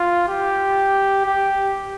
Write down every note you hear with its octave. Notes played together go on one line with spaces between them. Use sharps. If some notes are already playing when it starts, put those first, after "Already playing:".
Already playing: F4
G4
G4